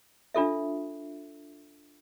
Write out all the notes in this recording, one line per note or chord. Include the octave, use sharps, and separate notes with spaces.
D4 F4 A4 E5